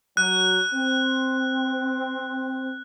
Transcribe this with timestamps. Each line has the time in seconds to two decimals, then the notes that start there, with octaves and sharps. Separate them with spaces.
0.17 F#3 F#6
0.74 C4